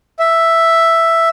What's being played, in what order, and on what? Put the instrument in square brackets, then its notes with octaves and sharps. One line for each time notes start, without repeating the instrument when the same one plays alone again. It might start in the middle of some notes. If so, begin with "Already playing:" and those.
[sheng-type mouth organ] E5